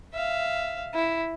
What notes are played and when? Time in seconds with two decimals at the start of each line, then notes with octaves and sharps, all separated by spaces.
0.13 E5 F5
0.94 E4